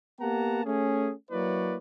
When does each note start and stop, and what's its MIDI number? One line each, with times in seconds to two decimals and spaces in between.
0.21 0.63 58
0.21 0.63 59
0.21 0.63 67
0.21 0.63 78
0.21 0.63 81
0.21 0.63 82
0.65 1.11 57
0.65 1.11 61
0.65 1.11 68
1.31 1.76 54
1.31 1.76 58
1.31 1.76 64
1.31 1.76 71
1.31 1.76 73
1.31 1.76 74